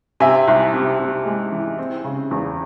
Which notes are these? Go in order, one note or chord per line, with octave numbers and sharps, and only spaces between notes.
C3 E5 G#5
C2
C3
C3
G#3
E3
C4
C#3
E2